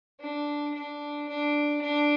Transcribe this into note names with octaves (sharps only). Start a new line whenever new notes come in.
D4
D4
D4
D4